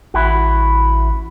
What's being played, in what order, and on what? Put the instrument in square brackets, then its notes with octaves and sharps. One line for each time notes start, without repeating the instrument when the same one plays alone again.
[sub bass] A1 [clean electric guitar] E4 F#4